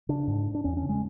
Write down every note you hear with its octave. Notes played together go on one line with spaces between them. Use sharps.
C#3 D4
G#2
D4
E2 C#4
C#4
C#3
G#3